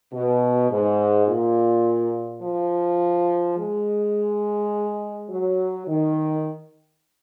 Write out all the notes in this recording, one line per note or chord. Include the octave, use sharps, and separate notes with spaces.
B2
G#2
A#2
F3
G#3
F#3
D#3